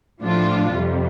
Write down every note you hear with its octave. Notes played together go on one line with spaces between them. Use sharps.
A2 F3 D4 F4
F2 C3 G3